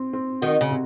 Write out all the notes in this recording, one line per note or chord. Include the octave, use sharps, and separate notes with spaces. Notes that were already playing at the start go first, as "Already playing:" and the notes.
Already playing: C4
C4
D#3 F#4
C#3
C3